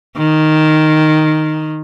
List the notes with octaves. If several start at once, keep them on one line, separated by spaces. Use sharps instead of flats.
D#3